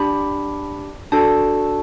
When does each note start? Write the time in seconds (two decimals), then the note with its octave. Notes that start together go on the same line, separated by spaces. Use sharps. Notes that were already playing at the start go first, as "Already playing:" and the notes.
Already playing: D4 G4 B5
1.12 D4 F#4 A4 A5